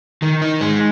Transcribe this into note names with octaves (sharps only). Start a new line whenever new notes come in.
D#3
D#4
G#3